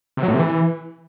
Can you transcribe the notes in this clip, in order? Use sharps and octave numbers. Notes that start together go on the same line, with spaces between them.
C3
F#3
A2
C3
E3